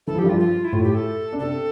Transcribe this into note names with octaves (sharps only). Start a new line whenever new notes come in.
E3 A4
F3
G4
G2 G3
F3 F4
F4
E4
A2 A3 F4
G4
A4
D4
C3 C4 A4